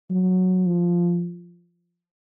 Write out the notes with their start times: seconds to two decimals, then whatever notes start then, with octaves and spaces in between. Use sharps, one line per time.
0.10 F#3
0.66 F3